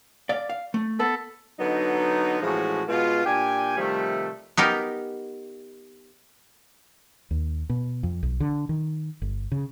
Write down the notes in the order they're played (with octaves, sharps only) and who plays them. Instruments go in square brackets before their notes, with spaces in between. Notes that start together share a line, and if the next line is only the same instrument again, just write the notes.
[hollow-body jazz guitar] D5 F5
F5
A3
[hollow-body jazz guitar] B3 B4 [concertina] A4
[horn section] D3 F#3 B3 D#4
A2 E3 F3 G#3 C#4 F#4
B2 G#3 B3 F4
A#2 D4 G4 G5 G#5
C3 D#3 F3 G3 A3
[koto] B3 D#4 G4 A#4
[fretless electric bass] D#2
B2
F2
B1
D3
D#3
G1
C#3